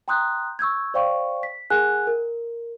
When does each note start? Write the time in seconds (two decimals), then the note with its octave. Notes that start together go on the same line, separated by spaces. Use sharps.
0.08 G5 A#5 C6 D#6 F#6 G6
0.59 C#6 E6 G6 G#6
0.94 C5 D5 F5 G5 C#6
1.43 B6
1.70 G#4 A#4 F#5 G#5 F#6
2.07 A#4